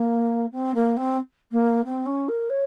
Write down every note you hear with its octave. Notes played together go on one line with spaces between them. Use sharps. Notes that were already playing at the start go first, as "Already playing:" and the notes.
Already playing: A#3
C4
A#3
C4
A#3
C4
C#4
A#4
C#5